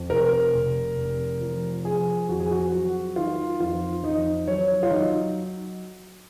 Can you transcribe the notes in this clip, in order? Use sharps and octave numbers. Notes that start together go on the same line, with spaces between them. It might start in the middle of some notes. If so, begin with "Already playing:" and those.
Already playing: F2
F1 A#4
F1
F1
F3
F3 G#4
F2 F#4
G#4
F#4
F#3 F#4
D#3 F4
F2 F4
F2 D#4
F#3 C#5
F4
F#3 D#4